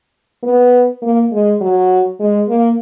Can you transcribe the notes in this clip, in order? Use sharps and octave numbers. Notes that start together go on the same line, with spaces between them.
B3
A#3
G#3
F#3
G#3
A#3